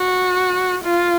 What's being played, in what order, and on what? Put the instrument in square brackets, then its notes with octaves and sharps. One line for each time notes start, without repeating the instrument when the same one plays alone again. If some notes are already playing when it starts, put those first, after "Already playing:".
Already playing: [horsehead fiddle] F#4
F4